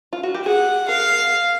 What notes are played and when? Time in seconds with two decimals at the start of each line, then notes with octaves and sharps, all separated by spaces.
0.13 F4
0.23 F#4
0.34 G4
0.45 G#4 F#5
0.88 A#4 F5